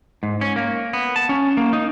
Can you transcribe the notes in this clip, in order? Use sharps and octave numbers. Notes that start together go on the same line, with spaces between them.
G#2
C#4
A#3
B3
A5
C#4
A#3
D#4